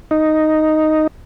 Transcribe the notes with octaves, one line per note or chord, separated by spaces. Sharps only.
D#4